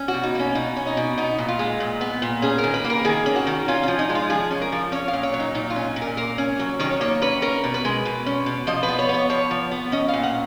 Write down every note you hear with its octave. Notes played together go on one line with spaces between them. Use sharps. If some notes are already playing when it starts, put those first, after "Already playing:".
Already playing: C#4
F#4
B2
D#4
A#3 C#4
B2 D#4
C#4
D#4
B2
B3 D#4
A#2
F4
G#3
A#2
B3
A#2
C#4 G#4
A#4
D#3
B4
A#3
A#4
D#3 G#4
C#4
F#4
D#3
C#4 F4
F3 C#4
D#4
G#3
F4
F3 G#4
C#4
A#4
F3
C#4 C#5
F5
A#2
C#5
F#3
D#4
A#2 D#4
F4
C#4
A#2
A#4
A#3 A#4
C#4
F#3
D#3 C#5
A#3 C#5
C#4 B4
C#4 A#4
B2
B4
G#3
B2
C#4
B2
F3 D#5
B4
B3
C#5
B3 C#5
F3 C#5
F3
B3
C#4 D#5
F5
A#2
F#5